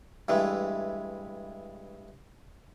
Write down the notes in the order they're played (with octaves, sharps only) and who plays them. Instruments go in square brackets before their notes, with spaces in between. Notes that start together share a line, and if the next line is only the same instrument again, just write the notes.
[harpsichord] G2 E3 G#3 A3